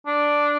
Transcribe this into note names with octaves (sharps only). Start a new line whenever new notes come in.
D4